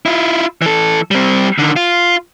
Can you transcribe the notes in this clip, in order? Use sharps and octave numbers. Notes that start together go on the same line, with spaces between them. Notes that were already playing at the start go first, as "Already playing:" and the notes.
E4 F4
E3 A4
G3 C4
D3 D#3
F4